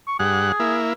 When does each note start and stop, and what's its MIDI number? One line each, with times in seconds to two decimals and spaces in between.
0.07 0.15 85
0.19 0.52 43
0.19 0.77 68
0.19 0.52 78
0.60 0.93 58
0.60 0.93 64